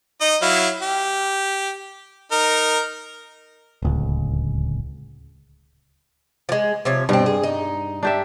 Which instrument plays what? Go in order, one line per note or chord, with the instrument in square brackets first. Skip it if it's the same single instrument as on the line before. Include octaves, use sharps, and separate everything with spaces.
[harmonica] D#4 D#5
F#3 E4 F5
G4
D#4 A#4
[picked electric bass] D1 C#2
[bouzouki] F3 G#3
C3 F3 C#5
[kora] G2 [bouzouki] B2 C4
[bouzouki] G#4
D#4
[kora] D4 G4 E5